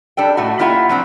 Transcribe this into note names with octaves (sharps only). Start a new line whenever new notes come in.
G3 D4 A4 G5
A2 A3 F#4
G3 A#3 E4 F4 E5 F#5
F3 F#3 C4 D4